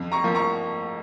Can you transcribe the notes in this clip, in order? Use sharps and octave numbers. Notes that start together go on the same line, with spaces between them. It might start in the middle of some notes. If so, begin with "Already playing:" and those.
Already playing: F2
A#5 C#6
F3 A#3
A#5 C#6